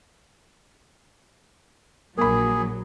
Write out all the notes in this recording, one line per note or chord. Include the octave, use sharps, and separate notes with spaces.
A#1 F#3 A#3 G#4 B5